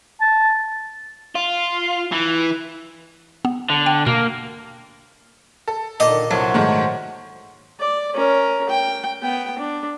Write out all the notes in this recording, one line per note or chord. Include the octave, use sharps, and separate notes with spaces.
A5
F4
E3
B3
D3
G5
B2 A#3
A4
A#2 D3 D#3 D#5
C2 F#3 F#4 A4 C5 F#5
G#2 D#3 A3
D5
C#4 A#4
G5
B3 G5
D4